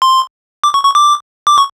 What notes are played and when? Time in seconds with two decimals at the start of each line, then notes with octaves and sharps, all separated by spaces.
0.02 C6
0.64 D6
0.74 C#6
0.85 C#6
0.95 D6
1.47 D6
1.58 C#6